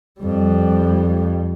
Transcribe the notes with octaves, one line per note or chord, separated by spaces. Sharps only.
F2 G3